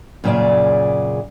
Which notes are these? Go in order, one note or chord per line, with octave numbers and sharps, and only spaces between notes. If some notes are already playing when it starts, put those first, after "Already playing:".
F#2 A#2 C#3 G#4 D5